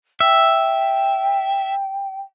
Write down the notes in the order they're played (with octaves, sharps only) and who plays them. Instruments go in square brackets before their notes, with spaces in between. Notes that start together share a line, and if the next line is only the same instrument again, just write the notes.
[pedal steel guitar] E5 [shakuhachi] G5